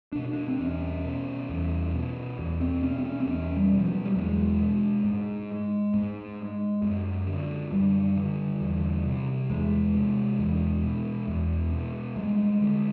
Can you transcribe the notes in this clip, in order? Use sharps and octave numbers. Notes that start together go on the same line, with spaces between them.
B2 D4
D4
C4
E2 C#4
B2
E2
B2
E2
C4
B2 C#4
C4
C#4
C4
E2 C#4
G3
B2
F3
F#3
G3
E2 G#3
B2
G#2
G#2
F#2
D3
F#2 G3
D3
E2
C3
E2 G#3
C3
E2
B2
E2
B2
G2 G#3
D3